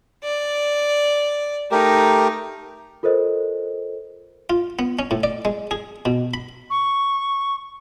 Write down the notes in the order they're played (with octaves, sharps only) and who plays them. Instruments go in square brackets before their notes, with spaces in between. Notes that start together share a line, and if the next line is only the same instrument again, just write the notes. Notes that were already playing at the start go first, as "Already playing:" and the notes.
[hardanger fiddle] D5
[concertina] A3 G4 A#4 [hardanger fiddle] D#4
[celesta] F4 A4 A#4 C5 D#5
[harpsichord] F4
B3
C#4
A2
D5
G#3
G#4
B2
B5
[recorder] C#6